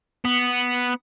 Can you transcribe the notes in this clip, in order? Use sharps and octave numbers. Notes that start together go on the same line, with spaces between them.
B3